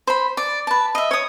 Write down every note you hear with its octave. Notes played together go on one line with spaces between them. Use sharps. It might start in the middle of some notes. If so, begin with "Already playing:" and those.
C5 B5
D5
B4 A5
D#5 E5
C#5 D#6